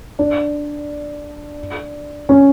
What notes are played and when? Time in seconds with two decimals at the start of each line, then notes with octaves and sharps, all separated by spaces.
0.19 D4
2.29 C#4